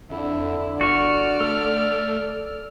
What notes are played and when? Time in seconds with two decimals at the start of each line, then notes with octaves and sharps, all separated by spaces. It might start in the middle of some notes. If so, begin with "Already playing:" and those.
0.10 F2 D3 E4
0.81 G1 F#4 D5 C#6 F6
1.41 A3 A4